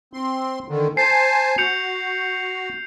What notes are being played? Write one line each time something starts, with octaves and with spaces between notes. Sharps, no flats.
C4 C6
D3 D#3
C5 G#5 A5 C7
F#4 G6 C#7 F7